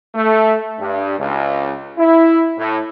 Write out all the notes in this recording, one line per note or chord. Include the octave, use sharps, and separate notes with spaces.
A3
G2
C#2
E4
A2